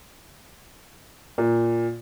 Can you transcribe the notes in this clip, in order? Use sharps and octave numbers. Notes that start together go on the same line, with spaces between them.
A#2